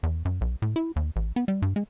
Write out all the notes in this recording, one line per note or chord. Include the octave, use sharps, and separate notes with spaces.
E2
F#2
B1
A2
E4
D#2
A1
B3
G3
G2
G#3